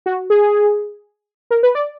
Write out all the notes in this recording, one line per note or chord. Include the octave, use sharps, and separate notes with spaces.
F#4
G#4
A#4
B4
D5